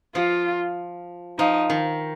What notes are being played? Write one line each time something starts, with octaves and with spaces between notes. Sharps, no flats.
F3 F4
F3 D#4
D#3